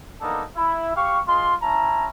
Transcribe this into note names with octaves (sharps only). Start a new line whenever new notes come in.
A#3 B3 D4 D#4 A4
E4
G4 F5 C#6
G#3 F4 C6
C#4 E4 A5 A#5